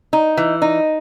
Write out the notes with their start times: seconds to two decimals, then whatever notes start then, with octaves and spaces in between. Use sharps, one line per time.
0.13 D#4
0.37 E3
0.62 D#4